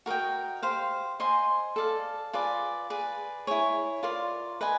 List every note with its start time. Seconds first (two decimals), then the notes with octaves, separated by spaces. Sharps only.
0.06 F#4 A#4 D#5 G5
0.63 G4 C5 F5
1.20 C5 D#5 G#5 C6
1.76 A4 D5 F5
2.33 F4 G#4 B4 D5
2.90 G#4 B4 D5
3.47 E4 G#4 C#5
4.03 F4 A#4 D5
4.61 B4 D#5 G#5